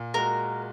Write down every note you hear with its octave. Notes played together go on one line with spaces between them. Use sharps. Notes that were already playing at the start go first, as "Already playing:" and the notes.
Already playing: A#2
G#3 F#4 A#4